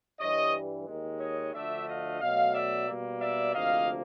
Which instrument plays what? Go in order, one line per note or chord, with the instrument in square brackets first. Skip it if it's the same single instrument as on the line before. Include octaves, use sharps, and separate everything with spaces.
[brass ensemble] G2 E3 G3 C#5 D#5
D#2 D#3 G#3
C#5 D#5
D2 D3 F3 A3 D5 E5
D#5 F5
B2 F#3 A3 D#5 F5
D5 E5
B2 G3 A#3
D5 E5
D2 C3 F3 A#3 D#5 F5